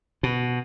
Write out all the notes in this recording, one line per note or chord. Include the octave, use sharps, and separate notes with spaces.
B2